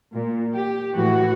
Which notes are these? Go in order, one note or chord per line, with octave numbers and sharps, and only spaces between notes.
A#2
G4
A2 E3 F#4